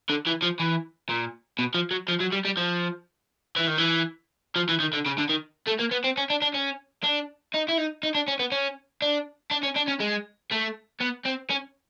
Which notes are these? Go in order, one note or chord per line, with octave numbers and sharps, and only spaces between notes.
D3
E3
F3
E3
A#2
B2
F3
F#3
F3
F#3
G3
G3
F3
E3
D#3
E3
F3
E3
D#3
D3
C#3
D3
D#3
A3
A#3
B3
C4
C#4
D4
D4
C#4
D4
D#4
E4
D#4
D#4
D4
C#4
B3
C#4
D4
D4
C#4
D4
C#4
G#3
A3
B3
C4
C#4